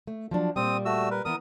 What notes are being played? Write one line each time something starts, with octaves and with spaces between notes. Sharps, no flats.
A3
F3 F#3 D4
A#2 G3 C4 D#6
A3 F#4 E6
A#4 B4
E3 B3 A#4 A#5 D#6